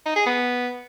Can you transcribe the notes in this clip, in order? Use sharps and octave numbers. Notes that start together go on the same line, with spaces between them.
D#4
G#4
B3